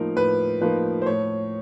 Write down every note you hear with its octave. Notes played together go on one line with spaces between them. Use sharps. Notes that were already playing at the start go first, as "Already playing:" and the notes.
Already playing: A2 F3 A#3 D#4 A#4
A2 B4
F3 A#3 D#4 B4
C5
A2 C#5